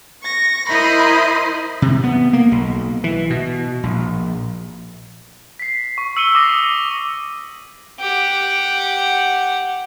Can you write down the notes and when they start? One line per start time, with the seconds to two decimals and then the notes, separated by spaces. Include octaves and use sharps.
0.22 C#6 A#6
0.69 E4 A#4 C5 D#5 B5 C6
1.82 C3
2.04 B3
2.33 A#3
2.52 B1
3.04 E3
3.30 B2
3.83 A#1
5.59 B6 C7
5.98 C#6
6.17 E6 C#7 D#7 G7
6.35 D6 D#6 A#6 C7
7.99 G4 F#5